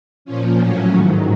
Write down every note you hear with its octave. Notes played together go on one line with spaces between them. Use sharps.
A#2 F3 C#4
A2 F#3 C#4
G#2 D#3 F#3